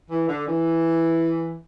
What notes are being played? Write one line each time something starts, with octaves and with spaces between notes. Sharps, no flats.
E3
D3
E3